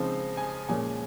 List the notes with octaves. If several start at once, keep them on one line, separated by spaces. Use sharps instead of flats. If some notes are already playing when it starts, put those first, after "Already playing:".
Already playing: C#3 F3 G#3 C4 D#4
G#5
A#2 F3 G#3 C#4 G#5